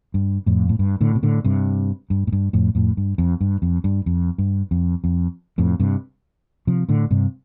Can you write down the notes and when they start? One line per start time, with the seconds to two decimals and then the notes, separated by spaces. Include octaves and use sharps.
0.14 G2
0.46 F2 A2
0.69 A2
0.79 G2
1.01 A2 D3
1.15 C3
1.23 A2 D3
1.44 G2 C3
2.10 G2
2.27 A2
2.32 G2
2.53 F2 A2
2.75 F2 A2
2.97 G2
3.18 F2
3.41 G2
3.62 F2
3.84 G2
4.06 F2
4.38 G2
4.71 F2
5.04 F2
5.58 F2 A2
5.80 G2 C3
6.67 C3 F3
6.89 A2 D3
7.11 G2 C3